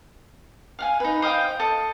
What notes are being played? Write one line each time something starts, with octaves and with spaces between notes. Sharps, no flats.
F5 F#5 G#5
D#4 B4
C5 D#5 F5 G5
A4 D#5